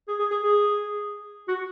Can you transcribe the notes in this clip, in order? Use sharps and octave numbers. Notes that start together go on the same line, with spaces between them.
G#4
G#4
G#4
G#4
F#4